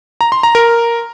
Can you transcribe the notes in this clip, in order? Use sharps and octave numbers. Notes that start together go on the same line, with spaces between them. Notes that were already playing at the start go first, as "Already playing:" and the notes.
A#5
C6
A#5
A#4